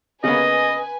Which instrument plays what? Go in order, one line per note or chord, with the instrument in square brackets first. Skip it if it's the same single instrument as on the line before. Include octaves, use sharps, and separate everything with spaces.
[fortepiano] C#3 A#3 B3 [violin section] B4 G#5 [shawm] D#5